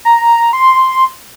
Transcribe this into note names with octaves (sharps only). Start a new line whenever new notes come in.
A#5
C6